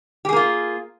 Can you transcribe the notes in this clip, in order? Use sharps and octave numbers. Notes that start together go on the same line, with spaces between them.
A#3 F4 G4 G#4